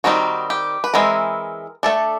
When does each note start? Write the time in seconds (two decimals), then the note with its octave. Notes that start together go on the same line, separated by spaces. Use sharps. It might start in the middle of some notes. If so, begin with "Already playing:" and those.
0.04 D#3 G3 C4 D#4 F#4
0.50 G4
0.84 B4
0.94 E3 G#3 C4 E4 A#4
1.83 A3 D4 A4